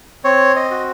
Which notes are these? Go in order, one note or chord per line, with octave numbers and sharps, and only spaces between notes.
C4 C#5
D#5
F#4